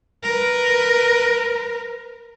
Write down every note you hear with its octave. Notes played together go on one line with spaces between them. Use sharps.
A#4 B4